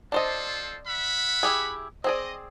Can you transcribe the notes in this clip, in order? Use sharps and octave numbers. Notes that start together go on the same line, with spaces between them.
C4 D4 F4 A4 C5 D#5
E5 F#5 B5
E4 G4 G#4
C4 G#4 D5 D#5